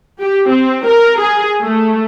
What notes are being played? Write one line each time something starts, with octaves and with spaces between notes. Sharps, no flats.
G4
C4
A#4
G#4
A3